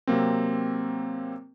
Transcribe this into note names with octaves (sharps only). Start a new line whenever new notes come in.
C3 F#3 A#3 C4